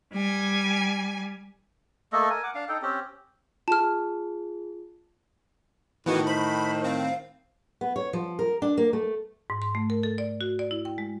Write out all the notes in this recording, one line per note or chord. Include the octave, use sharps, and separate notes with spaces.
G3 G#5
A3 A#3 A4 D#5
A#4 G#5
F#5 D6
D4 F5
D#4 A4 G5
C4 C#4 G4
F4 G#4 A5 F6
A2 D#3 E3 B3 F#4
C5 B5
C4 F5
B3
C#5
F3
A#4
D4
A#3
A3
G#2
C6
A3
A#4
A4
D5
F#4
D5
E4
G5
G#3